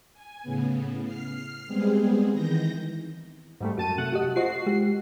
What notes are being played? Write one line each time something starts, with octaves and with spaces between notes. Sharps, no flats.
G#5
A2 C#3 B3
F6 C7
G3 G#3 B3 C4 G#4
D#3 E3 G6 A#6
G#2 G3 A3
F#2 F#4 A5 D#7
C3 A3 F#5
F#4 G4 D#5
F4 F#4 C5 D#5 C7
G#3 G4